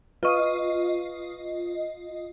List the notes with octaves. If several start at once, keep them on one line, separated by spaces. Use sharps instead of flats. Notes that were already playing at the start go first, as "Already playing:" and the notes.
F4 B4 D#5 C#6